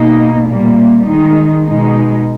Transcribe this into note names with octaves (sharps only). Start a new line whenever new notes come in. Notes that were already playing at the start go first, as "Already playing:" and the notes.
Already playing: B2 A#3 D#4
A#2 G3 A#3
D#3 G#3 D#4
B2 G#3 D#4